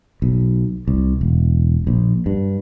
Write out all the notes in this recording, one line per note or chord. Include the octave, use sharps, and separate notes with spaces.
B1
C2
E1
A#1
G2